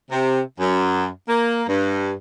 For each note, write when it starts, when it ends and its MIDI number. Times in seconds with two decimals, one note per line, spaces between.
0.11 0.40 48
0.60 1.07 42
1.28 1.63 58
1.68 2.12 43